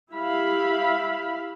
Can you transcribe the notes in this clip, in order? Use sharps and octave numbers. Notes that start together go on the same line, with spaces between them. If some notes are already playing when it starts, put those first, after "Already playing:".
E4 G4 E5 F5 B5